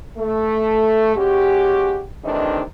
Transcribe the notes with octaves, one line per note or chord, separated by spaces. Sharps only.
A3
G#3 C#4 F#4 G4
C3 D#3 E3 A3 D4 D#4